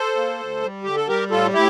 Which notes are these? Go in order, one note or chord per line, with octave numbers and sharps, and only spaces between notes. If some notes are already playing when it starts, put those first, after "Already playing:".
Already playing: A4 C5
A#3
D2
G3
D3 G4
A4
G3 G4 A#4
A2 F4 A4
A2 E4 G4